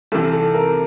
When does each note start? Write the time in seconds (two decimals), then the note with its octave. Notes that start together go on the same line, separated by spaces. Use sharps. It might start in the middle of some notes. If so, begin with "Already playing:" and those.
0.12 C2 C3 E3 A4
0.33 A4
0.54 A#4